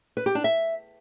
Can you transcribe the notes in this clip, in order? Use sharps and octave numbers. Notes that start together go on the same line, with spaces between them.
B4
G4
D4
E5